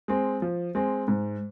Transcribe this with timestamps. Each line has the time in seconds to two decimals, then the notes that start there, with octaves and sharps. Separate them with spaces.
0.08 G#3 C4
0.42 F3
0.75 G#3 C4
1.08 G#2